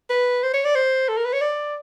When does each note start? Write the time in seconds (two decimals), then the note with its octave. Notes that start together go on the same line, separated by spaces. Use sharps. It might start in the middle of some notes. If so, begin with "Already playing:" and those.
0.10 B4
0.43 C5
0.53 C#5
0.65 D5
0.75 C5
1.09 A4
1.17 A#4
1.25 B4
1.33 C#5
1.41 D5